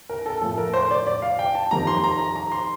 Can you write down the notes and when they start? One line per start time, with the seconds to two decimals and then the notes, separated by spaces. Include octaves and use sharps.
0.09 A#4
0.26 A4
0.42 A2 F3 A4
0.58 A#4
0.74 C5
0.91 D5
1.07 D5
1.22 F5
1.39 G5
1.55 A5
1.71 F2 D#3 G3 A#5
1.87 C6
2.04 A#5
2.19 A#5
2.36 A#5
2.52 C6